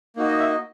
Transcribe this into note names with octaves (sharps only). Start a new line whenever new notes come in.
A#3 D#4 F#4
D#5
E5
D#5